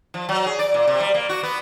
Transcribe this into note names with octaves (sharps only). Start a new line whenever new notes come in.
F3
F#3
G#4
D5
A#2
C3
G3
A#3
F#4
B3